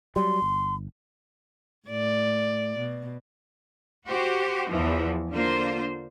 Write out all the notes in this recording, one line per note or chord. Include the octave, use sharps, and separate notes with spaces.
F#3 G3 C6
G1
A2 D5
B2
F#4 G4 C5
E2 E3 F3
D3 A#3 F4 C5